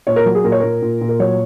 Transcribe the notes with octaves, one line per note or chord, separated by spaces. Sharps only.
A#2 C#5
A#4
F#3
G#4
A#2 A#4
C#5
A#2 A#4
A#2
A#2
A#4
F#3 C#5